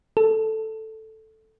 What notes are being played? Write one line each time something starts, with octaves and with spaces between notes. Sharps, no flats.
A4